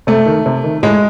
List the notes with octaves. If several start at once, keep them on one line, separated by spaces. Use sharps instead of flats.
C3 A3
D#3
C3
D#3
A2 G#3